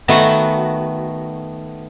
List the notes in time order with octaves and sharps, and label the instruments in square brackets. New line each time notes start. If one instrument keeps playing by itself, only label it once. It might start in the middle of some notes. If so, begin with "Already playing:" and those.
[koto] D#3 A3 B3 F#4 F#5